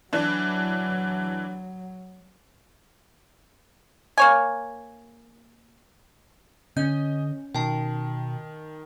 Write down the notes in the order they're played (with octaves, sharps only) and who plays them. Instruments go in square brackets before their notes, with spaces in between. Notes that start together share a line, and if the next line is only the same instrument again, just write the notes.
[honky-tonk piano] E3 D4 [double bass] F#3
[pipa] A#3 C#5 G#5
[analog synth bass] D3 [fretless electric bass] C#4 [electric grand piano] D#5 [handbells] G6
[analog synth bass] B2 [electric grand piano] D#3 [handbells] G5 A5